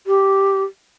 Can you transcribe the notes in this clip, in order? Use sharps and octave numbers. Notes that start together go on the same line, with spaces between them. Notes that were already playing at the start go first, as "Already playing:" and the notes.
G4